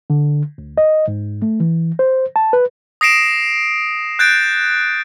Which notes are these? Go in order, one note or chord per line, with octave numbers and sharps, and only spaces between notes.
D3
D2
D#5
G#2
A3
E3
C5
A5
B4
D#6 A#6 C7 D7 E7
F#6 G6 A6 D7